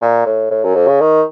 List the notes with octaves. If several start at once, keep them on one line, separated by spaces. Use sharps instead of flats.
A#2
A2
A2
F#2
F2
C#3
D#3